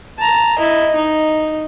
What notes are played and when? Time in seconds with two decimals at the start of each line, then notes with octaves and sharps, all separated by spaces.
0.18 A5 A#5
0.58 E4 D#5
0.96 D#4